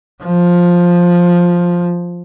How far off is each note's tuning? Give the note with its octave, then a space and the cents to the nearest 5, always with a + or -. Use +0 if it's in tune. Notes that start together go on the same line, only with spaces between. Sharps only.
F3 +5